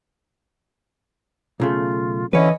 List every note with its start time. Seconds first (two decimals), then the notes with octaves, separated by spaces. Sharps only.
1.60 B1 C#3 A3 F4
2.33 D3 E3 C#4 E4 B4 C#5 D#5